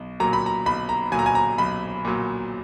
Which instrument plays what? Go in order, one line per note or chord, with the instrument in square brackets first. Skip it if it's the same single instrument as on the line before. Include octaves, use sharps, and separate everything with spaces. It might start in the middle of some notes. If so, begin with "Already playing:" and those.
Already playing: [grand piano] B1
A#2 F#3 A#5
B5
A#5
B1 B5
A#5
A#2 F#3 G#5
A#5
G#5
A#5
B1 B5
A#2 F#3